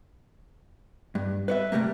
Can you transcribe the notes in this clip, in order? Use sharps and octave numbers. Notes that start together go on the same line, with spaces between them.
G2
B4 C#5 E5
C3 G3 A3 A#3